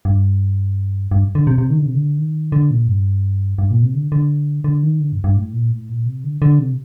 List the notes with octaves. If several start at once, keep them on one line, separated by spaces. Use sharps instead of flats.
G2
G2
D3
C3
C3
D#3
D3
C3
D3
D#3
D3
A#2
G2
G2
A#2
C3
D3
D3
D3
D#3
D3
G2
G2
A2
A#2
A2
A#2
C3
D3
D3
C3